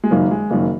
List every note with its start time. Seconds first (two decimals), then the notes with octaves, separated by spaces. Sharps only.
0.04 G#3
0.11 F#1 F#2 D#3 A#3
0.31 G#3
0.50 F#1 F#2 D#3 A#3